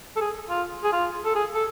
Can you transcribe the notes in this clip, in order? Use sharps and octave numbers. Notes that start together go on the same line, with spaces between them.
A4
G#4
F4
G#4
F4
A4
G#4
A4